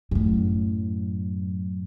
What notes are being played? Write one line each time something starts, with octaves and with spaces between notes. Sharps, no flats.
F#2 A2